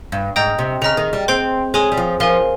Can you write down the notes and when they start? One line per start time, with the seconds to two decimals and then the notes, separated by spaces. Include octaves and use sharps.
0.12 G2
0.36 G#2 D#5 G5 A#5 D#6 G6
0.59 C3
0.82 C#3 G#4 D#5 A#5 F6
0.97 D#3
1.13 G3
1.28 C4 G#4 C5 G5 C6 G6
1.74 G#3 G#4 C#5 G#5 C6 D#6
1.92 G3
1.97 F3
2.20 F3 A#4 F5 G#5